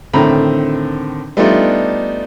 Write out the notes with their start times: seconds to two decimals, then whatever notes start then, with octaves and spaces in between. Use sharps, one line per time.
0.13 A2 D3 D#3 C4 A#5 B5
1.37 G3 A3 B3 D4 D#4 F4